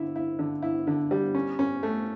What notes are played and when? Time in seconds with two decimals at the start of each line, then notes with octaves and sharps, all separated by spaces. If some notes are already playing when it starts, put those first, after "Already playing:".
Already playing: D3 E4
0.16 E4
0.39 D3
0.62 E4
0.87 D3
1.11 G3
1.35 C#4
1.59 C#4
1.83 A3